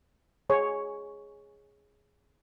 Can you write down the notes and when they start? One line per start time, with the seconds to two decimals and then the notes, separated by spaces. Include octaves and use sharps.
0.50 G#4 C#5